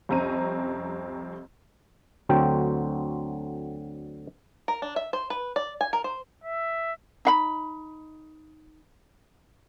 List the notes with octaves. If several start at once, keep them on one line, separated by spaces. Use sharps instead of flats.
C2 F2 C4 C#4 A#5 D#7
D2 D3 F#3 C4 G5
A#4
D4
E5
C5
B4
D5
G#5
A#4
C5
E5
D#4 F5 B5